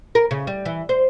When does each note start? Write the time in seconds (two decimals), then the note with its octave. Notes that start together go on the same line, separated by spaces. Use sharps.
0.15 A#4
0.31 C#3
0.47 G3
0.65 E3
0.89 C5